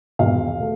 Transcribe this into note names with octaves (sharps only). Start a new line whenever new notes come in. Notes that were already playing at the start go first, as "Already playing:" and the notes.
E1 F5
A3